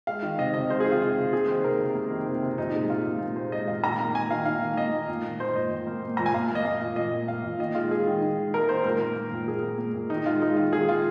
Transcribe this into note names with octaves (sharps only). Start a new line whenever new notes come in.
G#3 F5
D#3
C3 D#5
C3 D#5
G#3 C5
G#4
D#3
F4
C3 F4
C3
A#3 G#4
D#3 C5
C3 A#4
C3
A#3
D#3
C3
C3
A#2 D#4
G#3
G#3 F4
A#2
A#2
G#3 C5
G#3 D#5
A#2 F5
D#3 A#5
A#3
A#3 G#5
D#3 F5
D#3 F5
A#3
A#3 D#5
D#3
A#2
A#3
A#3 C5
A#2 D#5
A#2
A#3
A#3
A#2 A#5
G#5
A#2 F5
A#3
D#5
A#3 F5
A#2
A#2 D#5
A#3
A#3 F5
A#2
D#3 D#5
G#3 F4
G#3 G#4
D#3
D#3
G#3
G#3 A#4
D#3 C5
A#2 A#4
A#3
A#3
A#2
A#2 G#4
A#3
A#3
A#2
D#3 D#4
G#3 F4
G#3 D#4
D#3 F4
D#3 G#4
G#3 F4